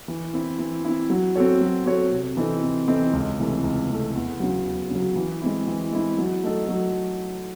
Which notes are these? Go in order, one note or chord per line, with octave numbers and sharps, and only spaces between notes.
E3
C4 E4
E3
C4 E4
F#3
C4 F#4 A4 C#5
F#3
C4 F#4 A4 C#5
C3
E3 C4 D#4 A4
C3
E3 C4 D#4 A4
C#2
C3 E3 A3
C#2
C3 E3 A3
E2
C#3 F#3
E2
C#3 F#3
E3
G#3 C4 E4
E3
G#3 C4 E4
F#3
A3 D#4 A4
F#3